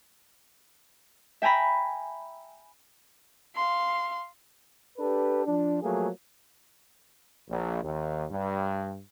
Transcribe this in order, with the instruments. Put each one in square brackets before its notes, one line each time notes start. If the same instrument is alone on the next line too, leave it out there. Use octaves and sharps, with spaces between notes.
[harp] E5 G5 G#5 A#5 B5
[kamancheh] F5 C6
[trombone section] D4 G4 A4 B4
F3 D4
F3 F#3 A3 A#3 G#4
A#1
D#2
G2